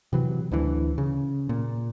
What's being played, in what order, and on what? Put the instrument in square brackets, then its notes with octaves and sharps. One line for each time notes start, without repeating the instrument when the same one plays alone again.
[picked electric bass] C3 E3 F#3
D2 D3 E3
C#3
A#2